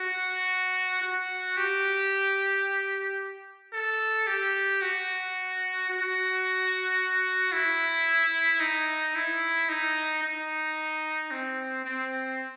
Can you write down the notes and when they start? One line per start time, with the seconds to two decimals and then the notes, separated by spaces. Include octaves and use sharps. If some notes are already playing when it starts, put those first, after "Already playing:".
Already playing: F#4
1.02 F#4
1.57 G4
3.73 A4
4.27 G4
4.82 F#4
5.90 F#4
7.52 E4
8.60 D#4
9.15 E4
9.69 D#4
10.23 D#4
11.31 C4
11.85 C4